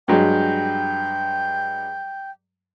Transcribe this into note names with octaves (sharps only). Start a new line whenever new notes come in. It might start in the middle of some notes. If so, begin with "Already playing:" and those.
G2 F#3 G#3 G5